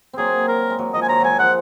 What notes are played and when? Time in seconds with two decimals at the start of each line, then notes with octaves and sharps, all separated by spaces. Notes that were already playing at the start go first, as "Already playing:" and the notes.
0.13 F#3 A#3 C4 G#4
0.48 A#4
0.70 G#3
0.79 F#3 A#3
0.94 F3 G#3 D#5
1.02 G#5
1.09 D#3 F#3 A#5
1.20 F3 F#3 G#3 G#5
1.39 F3 G#3 F#5